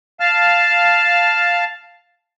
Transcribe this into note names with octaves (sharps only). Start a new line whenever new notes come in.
F5 A5 F6